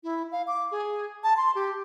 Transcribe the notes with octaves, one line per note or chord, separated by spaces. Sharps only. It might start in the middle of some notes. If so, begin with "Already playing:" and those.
E4
F5
D6
G#4
A5
C6
G4